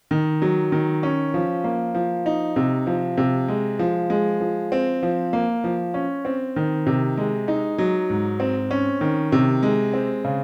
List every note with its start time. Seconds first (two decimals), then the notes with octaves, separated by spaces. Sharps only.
0.11 D#3
0.42 F#3
0.72 D#3
1.03 C#4
1.34 F3
1.64 A#3
1.95 F3
2.26 D#4
2.56 C3
2.87 F3
3.18 C3
3.48 G#3
3.79 F3
4.10 G#3
4.41 F3
4.72 C4
5.03 F3
5.33 A#3
5.64 F3
5.94 C#4
6.25 C4
6.56 D#3
6.87 C3
7.18 G#3
7.48 D#4
7.78 F#3
8.10 G#2
8.40 C4
8.71 C#4
9.01 D#3
9.32 C3
9.63 G#3
9.93 C4
10.24 C#3